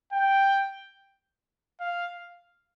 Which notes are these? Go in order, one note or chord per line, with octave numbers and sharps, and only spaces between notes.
G5
F5